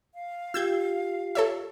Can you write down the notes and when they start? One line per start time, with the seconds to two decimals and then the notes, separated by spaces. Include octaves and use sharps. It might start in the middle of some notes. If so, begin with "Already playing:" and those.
0.14 F5
0.54 F4 G4 E6 G6 G#6
1.35 A4 C#5 E5